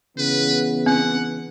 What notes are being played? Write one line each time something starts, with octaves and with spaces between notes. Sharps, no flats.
C#3 E3 B3 B4
C4 F#5